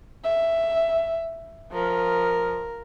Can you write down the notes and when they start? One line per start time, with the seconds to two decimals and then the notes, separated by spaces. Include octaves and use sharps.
0.25 E5
1.73 F3 A#4